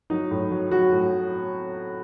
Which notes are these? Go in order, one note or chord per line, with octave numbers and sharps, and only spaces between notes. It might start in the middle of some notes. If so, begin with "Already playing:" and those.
F#3 D#4
A2
F#3
F#3 F#4
A2